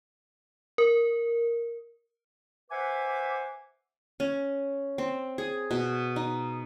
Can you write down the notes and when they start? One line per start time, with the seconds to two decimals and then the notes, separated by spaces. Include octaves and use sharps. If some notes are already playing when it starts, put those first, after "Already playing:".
0.78 A#4
2.71 B4 C5 E5 F#5 G#5 D6
4.20 C#4
4.98 C4
5.38 G#4
5.71 B2
6.16 D#4